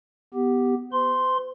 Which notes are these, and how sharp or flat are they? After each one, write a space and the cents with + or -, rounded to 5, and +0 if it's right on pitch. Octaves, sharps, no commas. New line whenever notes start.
B3 +5 G4 +0
C5 -40 C6 +0